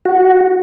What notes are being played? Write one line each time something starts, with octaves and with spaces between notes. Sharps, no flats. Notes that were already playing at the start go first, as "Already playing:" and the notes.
F#4